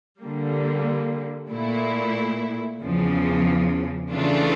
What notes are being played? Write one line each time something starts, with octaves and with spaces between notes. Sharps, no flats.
D3 G3 A#3
A#2 A3 E4
E2 C#3 F3
C#3 E3 A3 D4 F4